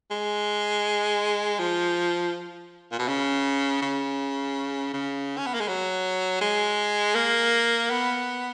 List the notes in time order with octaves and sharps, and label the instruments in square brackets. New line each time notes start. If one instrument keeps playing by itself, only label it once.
[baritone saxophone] G#3
F3
A#2
B2
C#3
C#3
C#3
C#4
B3
A#3
G#3
F#3
G#3
A#3
B3